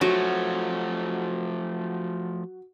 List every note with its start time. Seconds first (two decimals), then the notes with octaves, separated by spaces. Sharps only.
0.01 F3 F#3 A3 F#4